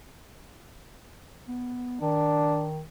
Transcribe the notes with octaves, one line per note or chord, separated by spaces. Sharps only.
B3
D#3 D4